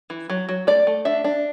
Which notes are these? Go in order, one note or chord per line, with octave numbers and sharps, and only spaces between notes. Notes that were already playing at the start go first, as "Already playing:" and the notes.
E3
F#3
F#3
A3 D5
A3
D4 E5
D4